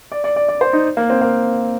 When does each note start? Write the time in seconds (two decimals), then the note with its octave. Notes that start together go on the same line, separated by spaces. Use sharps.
0.12 D5
0.24 D5
0.36 D5
0.49 D5
0.61 C5
0.73 D#4
0.97 A#3
1.10 C4
1.21 A#3